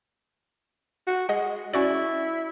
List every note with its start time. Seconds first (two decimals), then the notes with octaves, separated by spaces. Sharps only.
1.07 F#4
1.29 G#3 G#4 D#5 F#5
1.74 C#4 E4 F#4 D5